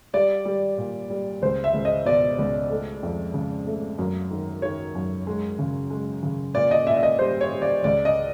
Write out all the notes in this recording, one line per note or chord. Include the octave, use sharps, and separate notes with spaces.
G3 D5
G3
A#2
G3
C#2 C5
E5
C#2
D#5
B2 D5
C#2
A3
F2
C#3
A3
F#2
D#3
D#3 C#5
F#2
G#3
C#3
G#3
C#3
A#2 D5
D#5
A#2 E5
E5
D#5
G3 C5
C#5
G3
D5
C#2 D5
D#5